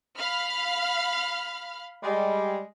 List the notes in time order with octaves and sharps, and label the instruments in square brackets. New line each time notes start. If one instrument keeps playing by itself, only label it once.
[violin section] F5 B5 F6
[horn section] G3 G#3